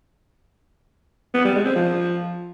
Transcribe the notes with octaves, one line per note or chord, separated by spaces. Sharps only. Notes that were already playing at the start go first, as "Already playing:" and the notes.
B3
G3
G#3
C4
F3